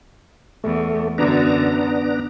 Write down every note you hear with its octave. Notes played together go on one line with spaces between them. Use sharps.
E2 A3
F#2 D3 B3 D4 A#5